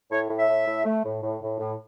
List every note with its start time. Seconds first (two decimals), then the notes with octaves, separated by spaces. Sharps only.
0.11 A2 C#5
0.29 A2
0.39 E5
0.49 A2
0.67 A2
0.85 A3
1.04 A2
1.22 A2
1.41 A2
1.59 A2